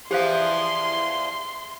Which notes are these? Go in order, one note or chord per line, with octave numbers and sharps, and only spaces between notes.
E2 E3 F3 G4 C5 F5 C6